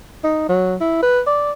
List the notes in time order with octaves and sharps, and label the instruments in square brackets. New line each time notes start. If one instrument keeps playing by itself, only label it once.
[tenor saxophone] D#4
F#3
E4
B4
D5